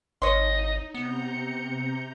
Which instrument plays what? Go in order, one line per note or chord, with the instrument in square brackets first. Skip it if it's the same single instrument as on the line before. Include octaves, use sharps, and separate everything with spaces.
[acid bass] G#1 [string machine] D#4 [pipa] C#5 C6 [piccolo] D#5
[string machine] C3 A#5 G6 [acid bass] B3 [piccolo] C#7